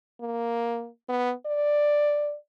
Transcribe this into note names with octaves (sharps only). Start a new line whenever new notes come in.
A#3
B3
D5